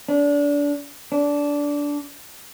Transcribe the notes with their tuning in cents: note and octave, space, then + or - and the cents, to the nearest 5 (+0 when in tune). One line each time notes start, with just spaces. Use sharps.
D4 -25
D4 -15